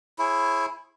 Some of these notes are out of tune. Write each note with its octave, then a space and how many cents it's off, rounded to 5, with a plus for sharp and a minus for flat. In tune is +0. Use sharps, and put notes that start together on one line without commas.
E4 +5 G#4 +0 C#5 -45